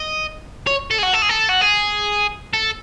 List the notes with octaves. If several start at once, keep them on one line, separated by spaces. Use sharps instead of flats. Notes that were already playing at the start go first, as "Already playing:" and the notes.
Already playing: D#5
C#5
A4
G#4
F#4
A4
G#4
A4
F#4
G#4
A4